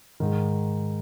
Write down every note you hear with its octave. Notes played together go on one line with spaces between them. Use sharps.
G#2 D#3